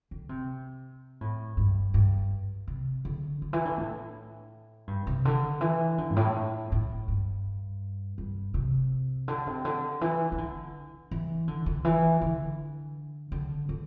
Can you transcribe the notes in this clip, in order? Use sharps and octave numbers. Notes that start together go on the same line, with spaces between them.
D3
C3
A2
G2
G2
C3
D3
D3
E3
D3
A2
G2
C3
D3
E3
D3
G2
A2
A2
G2
G2
C3
D3
C3
D3
E3
E3
D3
E3
D3
D3
E3
D3
D3
D3